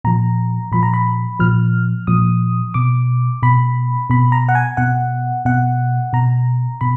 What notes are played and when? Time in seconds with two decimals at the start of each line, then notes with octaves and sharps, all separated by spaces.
0.04 A#2 F3 A#5
0.72 A#2 F3 B5
0.83 A#5
0.94 B5
1.39 A#2 F3 F6
2.07 A#2 F3 D#6
2.74 B2 D6
3.43 B2 B5
4.10 B2 B5
4.32 A#5
4.49 F#5
4.55 G#5
4.77 B2 F#5
5.45 B2 F#5
6.13 B2 A#5
6.81 B2 B5